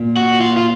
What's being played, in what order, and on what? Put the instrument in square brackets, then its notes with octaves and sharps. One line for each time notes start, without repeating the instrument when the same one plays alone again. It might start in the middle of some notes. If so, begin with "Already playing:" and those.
Already playing: [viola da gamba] A#2
[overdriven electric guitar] F#4
F4
F4